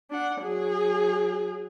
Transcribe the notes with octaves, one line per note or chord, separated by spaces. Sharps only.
D4 F#5
F#3 G#4